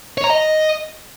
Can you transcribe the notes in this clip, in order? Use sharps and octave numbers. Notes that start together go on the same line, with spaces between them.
C#5
A#5
D#5